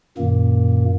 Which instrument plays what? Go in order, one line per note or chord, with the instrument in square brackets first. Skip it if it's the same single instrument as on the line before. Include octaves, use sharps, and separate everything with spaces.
[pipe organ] F#2 A#2 D#3 A#3